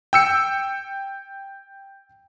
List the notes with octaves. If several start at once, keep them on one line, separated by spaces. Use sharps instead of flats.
G5 E6 C#7